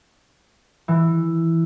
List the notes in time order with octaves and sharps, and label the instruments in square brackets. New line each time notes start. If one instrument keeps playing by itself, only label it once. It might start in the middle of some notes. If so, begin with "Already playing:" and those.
[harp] E3